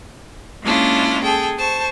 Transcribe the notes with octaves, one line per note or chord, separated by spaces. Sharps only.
G#3 A#3 C#4 D4 E4 F4
G#4 A4 G5
C5 A5 C#6